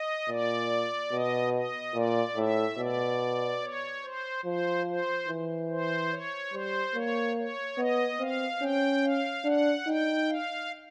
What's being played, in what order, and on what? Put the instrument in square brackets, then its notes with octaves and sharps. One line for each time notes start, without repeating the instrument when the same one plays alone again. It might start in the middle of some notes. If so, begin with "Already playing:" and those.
Already playing: [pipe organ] D#5
[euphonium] A#2 [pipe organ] D5
[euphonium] B2 [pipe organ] D#5
[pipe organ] D#5
[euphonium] A#2 [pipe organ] D5
[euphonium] A2 [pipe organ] E5
[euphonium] B2 [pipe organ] D5
[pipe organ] C#5
C5
[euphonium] F3 [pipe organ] C5
[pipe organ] C5
[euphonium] E3
[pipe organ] C5
C#5
[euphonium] G3 [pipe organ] C5
[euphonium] A#3 [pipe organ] C#5
[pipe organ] C#5
[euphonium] B3 [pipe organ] D#5
[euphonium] C4 [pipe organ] F5
[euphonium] C#4 [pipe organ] G5
[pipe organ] F5
[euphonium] D4 [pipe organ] F#5
[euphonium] D#4 [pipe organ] G5
[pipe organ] F5